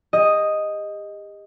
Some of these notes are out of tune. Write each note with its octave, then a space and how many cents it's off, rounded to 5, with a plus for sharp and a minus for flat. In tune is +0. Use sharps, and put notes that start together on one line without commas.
G4 +40 D#5 +0